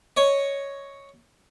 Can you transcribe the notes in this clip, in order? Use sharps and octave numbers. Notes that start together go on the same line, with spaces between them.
C#5 D#5